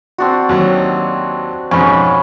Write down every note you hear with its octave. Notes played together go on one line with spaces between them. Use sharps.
C4 D4 F#4
D#2 F#3
F2 G#2 B2 C#4 B5